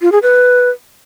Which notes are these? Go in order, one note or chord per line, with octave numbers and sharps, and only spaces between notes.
F4
G#4
B4